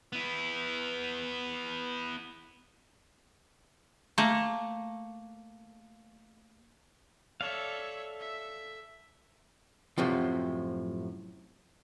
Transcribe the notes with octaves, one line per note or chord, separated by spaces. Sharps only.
B3 E4
A3 A#3
A4 C#5 D5 E5 F5
E5
F#2 A2 C3 F3